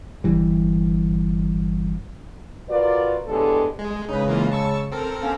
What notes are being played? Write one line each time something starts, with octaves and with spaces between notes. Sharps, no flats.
G1 E3 G3
F4 F#4 A#4 B4 D5
A2 D3 G#3 B3 G4 A4
G#3
C#3 G#3 D#4 B4
E3 A#3 F4
A5 C#6 E6
C4 A4 A#4
A#3 B3 C#4